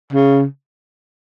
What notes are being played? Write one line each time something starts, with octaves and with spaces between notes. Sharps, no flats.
C#3